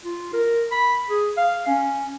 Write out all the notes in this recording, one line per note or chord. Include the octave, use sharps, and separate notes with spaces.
F4
A#4
B5
G#4
F5
C#4